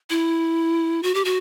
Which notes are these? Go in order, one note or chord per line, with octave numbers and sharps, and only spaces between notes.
E4
F#4
G4
F#4